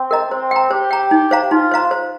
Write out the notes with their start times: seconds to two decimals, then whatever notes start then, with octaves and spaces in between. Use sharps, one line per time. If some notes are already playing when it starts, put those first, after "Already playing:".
Already playing: C4
0.11 A#4 D#5 A#5
0.31 C4 C5
0.51 G5 A#5
0.71 G4 C5
0.91 G5 A#5
1.11 D#4
1.31 C5 F5 A#5
1.51 D#4 F4
1.72 C5 F5 A#5
1.91 C5